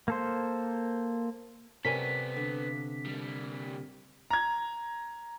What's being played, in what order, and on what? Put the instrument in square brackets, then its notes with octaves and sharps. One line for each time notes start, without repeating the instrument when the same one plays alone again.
[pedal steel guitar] A#3 A4 C5
[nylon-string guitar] C3 D5 [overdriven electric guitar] B3 A4 [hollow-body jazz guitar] C#4 A#4 G#5 [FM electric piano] B6
[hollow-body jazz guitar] D3
[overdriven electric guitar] G3 A#3
[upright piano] A#5 G#6